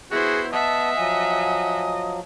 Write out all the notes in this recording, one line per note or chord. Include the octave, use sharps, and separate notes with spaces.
B3 E4 F#4 G#4 C5
D#5 E5 F#5 A5
F3 F#3 G#5